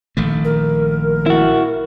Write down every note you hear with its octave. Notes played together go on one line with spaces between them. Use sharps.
A#1 D#3 A3
A#4
E4 F#4